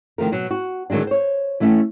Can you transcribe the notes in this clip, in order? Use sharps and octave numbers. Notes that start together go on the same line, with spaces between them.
D#3 F3 A3 A#4
B2 F#3
F#4
D3 D#3 F#3 G#3 D4
C5 C#5
E3 A3 C#4 E5